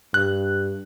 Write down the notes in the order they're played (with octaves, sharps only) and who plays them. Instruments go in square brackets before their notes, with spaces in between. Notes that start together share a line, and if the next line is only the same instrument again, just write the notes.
[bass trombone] G2 [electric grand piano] F#6